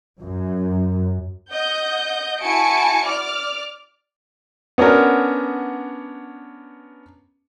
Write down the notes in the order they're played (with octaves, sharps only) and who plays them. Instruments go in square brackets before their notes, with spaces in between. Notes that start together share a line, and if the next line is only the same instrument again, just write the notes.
[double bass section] F#2
[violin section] D#5 F#5 G6
E4 F#4 G#5 A5 C#7 D7
D5 D6 F6
[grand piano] B3 C#4 D4 F#4 A#4